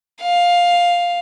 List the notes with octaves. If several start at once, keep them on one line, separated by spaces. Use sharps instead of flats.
F5